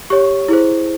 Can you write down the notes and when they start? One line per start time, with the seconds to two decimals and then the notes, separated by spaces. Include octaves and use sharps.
0.10 G4 C#5 C#6
0.48 E4 G#4 C5